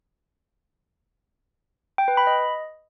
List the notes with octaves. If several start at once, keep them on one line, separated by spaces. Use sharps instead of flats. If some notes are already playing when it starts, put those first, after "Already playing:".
G5
B4
B5
D#5